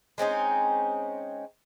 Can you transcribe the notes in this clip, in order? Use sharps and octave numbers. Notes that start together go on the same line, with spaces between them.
G#3 C4 C#4 D#4